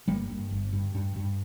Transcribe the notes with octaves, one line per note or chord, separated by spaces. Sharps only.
G1 G3 A#3
G2
G1
G2
G2
G2